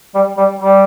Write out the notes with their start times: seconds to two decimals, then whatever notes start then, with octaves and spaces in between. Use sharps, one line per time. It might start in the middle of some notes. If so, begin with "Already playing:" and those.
0.15 G3
0.38 G3
0.59 G3